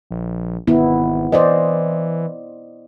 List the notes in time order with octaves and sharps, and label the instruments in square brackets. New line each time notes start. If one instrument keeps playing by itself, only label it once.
[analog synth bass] A#1
[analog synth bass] G#1 [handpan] B3 E4
[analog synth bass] E3 [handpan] C5 D5 D#5